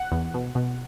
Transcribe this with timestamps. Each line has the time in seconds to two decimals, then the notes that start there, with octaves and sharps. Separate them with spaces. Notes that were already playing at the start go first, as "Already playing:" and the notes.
Already playing: F#5
0.12 E2
0.34 B2
0.55 B2